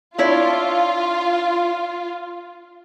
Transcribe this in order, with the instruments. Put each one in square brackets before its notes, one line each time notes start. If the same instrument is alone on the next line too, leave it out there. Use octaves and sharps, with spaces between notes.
[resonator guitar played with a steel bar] D4 E4 C#5 [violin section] F4